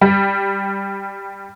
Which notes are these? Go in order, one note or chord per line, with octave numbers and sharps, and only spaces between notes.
G3